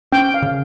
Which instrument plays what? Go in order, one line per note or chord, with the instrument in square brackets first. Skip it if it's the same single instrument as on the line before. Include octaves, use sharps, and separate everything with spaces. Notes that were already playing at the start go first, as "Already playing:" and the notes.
[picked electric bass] C#4 [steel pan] G5
[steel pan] F5
[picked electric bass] C#3